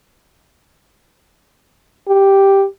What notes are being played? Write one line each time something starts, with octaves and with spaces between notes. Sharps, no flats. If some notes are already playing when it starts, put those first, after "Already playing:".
G4